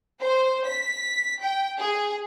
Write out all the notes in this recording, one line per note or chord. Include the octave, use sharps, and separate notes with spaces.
C5
B6
G5
G#4